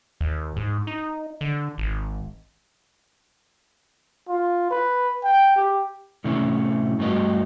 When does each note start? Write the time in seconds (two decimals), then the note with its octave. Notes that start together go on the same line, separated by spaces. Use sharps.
0.21 D#2
0.56 G#2
0.87 D#4
1.41 D3
1.78 G#1
4.28 F4
4.71 B4
5.24 G5
5.56 G4
6.24 A2 C3 E3 A3 C#4 E4
6.99 G2 A3 F#4 B4 D#5 F5